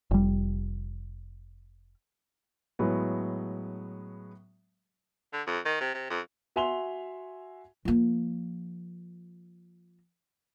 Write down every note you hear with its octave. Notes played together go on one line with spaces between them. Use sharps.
F1 G3
A2 F#3 G#3 B3
D3
F2
D#3
C3
C3
F2
F#4 E5 G#5 C6 F7 G7
F3 A#3